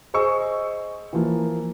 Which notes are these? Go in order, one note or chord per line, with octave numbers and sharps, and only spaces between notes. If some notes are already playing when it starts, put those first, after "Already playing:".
G#4 C5 D#5 C#6 E6
E3 F3 A#3